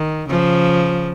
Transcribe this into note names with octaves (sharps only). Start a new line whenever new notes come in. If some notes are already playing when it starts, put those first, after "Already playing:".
Already playing: D#3
C#3 F3